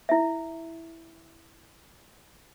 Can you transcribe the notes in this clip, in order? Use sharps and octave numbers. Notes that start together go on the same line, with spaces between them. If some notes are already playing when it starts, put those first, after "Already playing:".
E4 E5